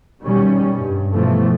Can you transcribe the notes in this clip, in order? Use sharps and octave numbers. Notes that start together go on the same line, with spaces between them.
B2 D#3 G3 C#4
G2
B2 E3 F3 A3